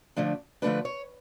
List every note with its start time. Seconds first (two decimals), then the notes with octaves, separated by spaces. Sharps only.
0.16 D3 F3 A3 D4
0.62 D3 F3 A3 D4 B4
0.85 C#5